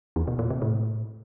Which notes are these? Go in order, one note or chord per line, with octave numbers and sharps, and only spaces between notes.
E2
B2
A#2
C3
A2